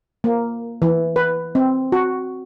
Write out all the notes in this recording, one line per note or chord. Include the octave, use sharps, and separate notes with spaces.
A#3
E3
B4
C4
F#4